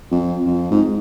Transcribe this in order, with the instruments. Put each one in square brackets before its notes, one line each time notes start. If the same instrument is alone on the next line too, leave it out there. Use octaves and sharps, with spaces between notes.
[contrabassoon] F2
F2
G#2